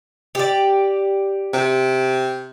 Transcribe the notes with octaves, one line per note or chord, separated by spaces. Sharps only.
G4 D5
C3